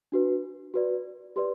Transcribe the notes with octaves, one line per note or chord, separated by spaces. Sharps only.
D4 F#4 B4
F#4 B4 D5
G4 B4 D5 C6